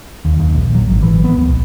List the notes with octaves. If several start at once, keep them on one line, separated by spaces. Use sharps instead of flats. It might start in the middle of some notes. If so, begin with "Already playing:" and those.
D#2
D#2
A#1
F#3
G#1
E3
B3
C#2
A#1